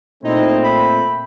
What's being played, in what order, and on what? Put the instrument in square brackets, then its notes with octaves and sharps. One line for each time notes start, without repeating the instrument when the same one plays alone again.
[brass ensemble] A#2 A3 C4 [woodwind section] D#4 E4 D#5
[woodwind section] B5